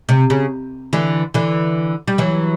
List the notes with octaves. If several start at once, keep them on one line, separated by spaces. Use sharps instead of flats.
C3
C#3
D3 E3
D3 E3
G3
E3 F#3